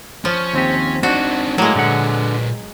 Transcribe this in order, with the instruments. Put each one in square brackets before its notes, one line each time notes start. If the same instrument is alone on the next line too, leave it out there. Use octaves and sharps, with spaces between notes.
[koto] F3 [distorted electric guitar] C#4
[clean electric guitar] D#2 C4 G4
[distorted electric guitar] C4 D#4 [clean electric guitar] D4 [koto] F#4
[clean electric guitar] A2 [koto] F#3 G#3 [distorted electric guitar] A#3
[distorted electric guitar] A#2 B4 [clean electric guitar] D3 F#5